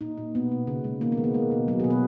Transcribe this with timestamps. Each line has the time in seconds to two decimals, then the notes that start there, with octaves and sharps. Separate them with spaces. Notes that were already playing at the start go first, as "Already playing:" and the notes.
0.01 A#2 D#4
0.17 A#2
0.35 B2 B3
0.51 B2
0.67 C#3
0.84 G#3
1.01 D#3 A#3
1.12 B3
1.17 G#3
1.24 A#3
1.34 G#3
1.51 B2
1.68 F#3 B3
1.80 B2 G#4
1.90 B4